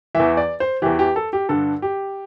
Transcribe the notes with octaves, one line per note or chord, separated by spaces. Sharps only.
E2 E3 E5
D5
C5
E2 E3 G4
G4
A4
G4
G2 D3 A4
G4